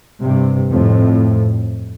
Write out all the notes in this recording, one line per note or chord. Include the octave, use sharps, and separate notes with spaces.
G2 C3
F2 A2